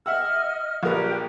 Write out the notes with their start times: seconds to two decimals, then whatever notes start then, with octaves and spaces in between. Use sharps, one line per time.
0.06 D#5 E5 F#5 E6 F6
0.83 A#1 G4 A#4 B4 D5